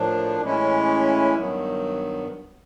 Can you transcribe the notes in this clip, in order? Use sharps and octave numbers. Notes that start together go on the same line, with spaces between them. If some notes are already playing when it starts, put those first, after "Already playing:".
Already playing: A2 F3 A#3 D4
A2 E3 G#3 C#4 E4
G2 D#3 F#3 B3